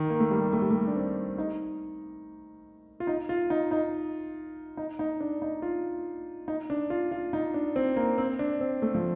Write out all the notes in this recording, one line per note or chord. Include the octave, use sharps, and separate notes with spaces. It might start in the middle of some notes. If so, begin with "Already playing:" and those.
Already playing: D#3
A#3
A3
G3
A3
G3
A3
D4
C4
D#4
F4
D#4
F4
D#4
D#4
D#4
D#4
D4
D#4
F4
D#4
D4
F4
F4
D#4
D4
C4
A#3
C4
D4
C4
A3
F3